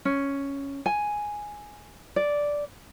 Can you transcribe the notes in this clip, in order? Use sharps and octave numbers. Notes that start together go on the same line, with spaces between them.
C#4
G#5
D5